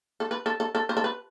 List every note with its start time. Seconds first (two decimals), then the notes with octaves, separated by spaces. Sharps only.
0.20 A4
0.31 B4
0.46 A4
0.60 A4
0.75 A4
0.89 C5
0.97 A4
1.04 B4